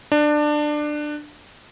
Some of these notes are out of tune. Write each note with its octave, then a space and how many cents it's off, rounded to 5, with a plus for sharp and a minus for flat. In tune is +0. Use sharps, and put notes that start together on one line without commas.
D4 +20